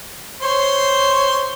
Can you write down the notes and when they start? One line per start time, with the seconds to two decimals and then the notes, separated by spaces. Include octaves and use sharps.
0.42 C5 C#5 C6